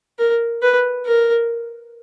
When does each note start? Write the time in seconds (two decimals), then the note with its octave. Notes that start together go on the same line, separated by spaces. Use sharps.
0.19 A#4
0.62 B4
1.06 A#4